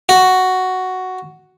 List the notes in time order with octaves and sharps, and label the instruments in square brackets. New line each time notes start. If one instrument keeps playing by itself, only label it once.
[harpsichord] F#4